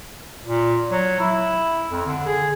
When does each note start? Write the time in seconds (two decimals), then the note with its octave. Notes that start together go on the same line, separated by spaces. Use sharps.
0.45 A#2
0.91 F#3
1.20 E4
1.91 F2
2.06 D3
2.26 G#4